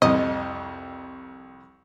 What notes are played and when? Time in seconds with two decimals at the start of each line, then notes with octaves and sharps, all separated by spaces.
0.02 C2 F2 C3 D#5